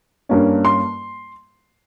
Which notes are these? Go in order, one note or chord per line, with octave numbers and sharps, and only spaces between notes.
G2 G3 A#3 C#4
C6